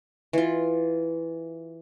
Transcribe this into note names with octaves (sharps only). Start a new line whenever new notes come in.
E3 F4